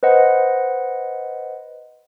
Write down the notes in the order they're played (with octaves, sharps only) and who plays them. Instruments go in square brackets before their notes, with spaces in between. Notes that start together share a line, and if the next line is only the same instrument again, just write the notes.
[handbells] B4 C5 D#5 F#5